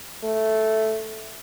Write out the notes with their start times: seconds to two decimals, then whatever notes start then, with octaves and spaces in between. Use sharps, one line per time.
0.24 A3